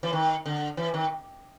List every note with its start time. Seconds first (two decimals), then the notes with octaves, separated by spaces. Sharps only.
0.03 E3
0.13 D#3
0.46 D3
0.77 E3
0.94 D#3